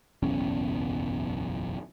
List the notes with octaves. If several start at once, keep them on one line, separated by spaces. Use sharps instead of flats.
F#1 B1 E2 C#4